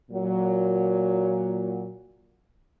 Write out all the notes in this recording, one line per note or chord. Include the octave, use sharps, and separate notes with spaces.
A#2 F#3